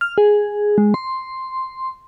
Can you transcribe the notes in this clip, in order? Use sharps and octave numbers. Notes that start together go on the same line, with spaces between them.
F6
G#4
G#3
C6